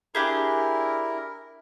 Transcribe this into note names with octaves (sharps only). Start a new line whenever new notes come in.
D4 E4 G4 G#4 A#4